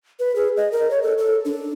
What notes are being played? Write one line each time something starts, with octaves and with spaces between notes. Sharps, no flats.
B4
G#4
D#5
A#4
C#5
A4
A4
D4